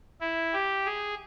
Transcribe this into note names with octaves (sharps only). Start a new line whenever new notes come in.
E4
G4
G#4